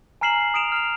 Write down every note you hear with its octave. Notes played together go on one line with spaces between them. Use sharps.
G#5 A#5 F6 C7 E7 F#7
D#6 C7 D7 E7 F7
F6 F7